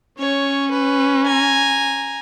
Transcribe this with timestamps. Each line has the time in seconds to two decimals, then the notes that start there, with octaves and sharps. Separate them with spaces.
0.19 C#4 C#5
0.71 B4
1.26 G#5 A#5